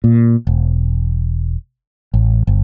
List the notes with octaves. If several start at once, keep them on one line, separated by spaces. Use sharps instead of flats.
A#2
E1
A1
G1